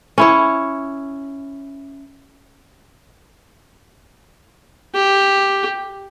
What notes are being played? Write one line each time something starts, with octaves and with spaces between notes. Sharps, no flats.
C#4 E4 C#5
G4